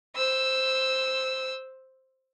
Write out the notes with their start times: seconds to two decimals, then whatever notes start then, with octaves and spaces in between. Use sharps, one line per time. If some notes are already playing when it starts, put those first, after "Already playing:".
0.16 C5 E6